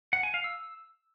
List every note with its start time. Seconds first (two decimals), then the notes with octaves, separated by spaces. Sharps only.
0.13 F#5
0.23 G#5
0.34 F5
0.44 E6